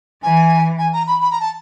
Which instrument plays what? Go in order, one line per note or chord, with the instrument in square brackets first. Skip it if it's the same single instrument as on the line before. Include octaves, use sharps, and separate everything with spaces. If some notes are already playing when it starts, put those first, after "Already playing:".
[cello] E3 [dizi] G#5
[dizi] G#5
A#5
B5
B5
A#5
A5